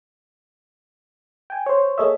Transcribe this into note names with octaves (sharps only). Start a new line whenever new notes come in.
G5 G#5
C5 C#5
A#3 G#4 A4 C#5 D#5 E5